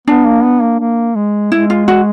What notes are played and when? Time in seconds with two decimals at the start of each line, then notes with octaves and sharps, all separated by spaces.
0.07 B3 D4
0.26 A#3
0.44 B3
0.62 A#3
0.80 A#3
1.15 G#3
1.52 G#3 E4
1.70 F4
1.88 F#4